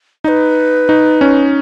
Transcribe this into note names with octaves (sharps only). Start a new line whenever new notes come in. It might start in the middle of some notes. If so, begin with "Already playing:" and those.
D#4 B4 D#5
D#4
C#4